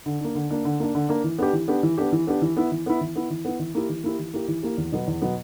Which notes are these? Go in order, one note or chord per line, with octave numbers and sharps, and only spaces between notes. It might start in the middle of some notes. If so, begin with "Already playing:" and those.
D3
A#3 D4
D3
A#3 D4
D3
A#3 D4
D3
A#3 D4
E3
B3 D4 G4
E3
B3 D4 G4
E3
B3 D4 G4
E3
B3 D4 G4
E3
B3 E4
E3
B3 E4
E3
B3 E4
E3
B3 E4
E3
A#3 E4 G4
E3
A#3 E4 G4
E3
A#3 E4 G4
E3
A#3 E4 G4
E2
B2 F#3 B3
E2
B2 F#3 B3